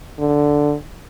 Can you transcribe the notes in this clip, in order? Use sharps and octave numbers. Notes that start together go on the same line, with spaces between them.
D3